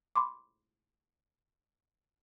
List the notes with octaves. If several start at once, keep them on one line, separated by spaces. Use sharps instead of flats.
B5 C6 D6